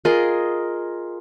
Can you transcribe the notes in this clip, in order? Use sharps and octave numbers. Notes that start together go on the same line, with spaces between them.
F4 G#4 A#4 D#5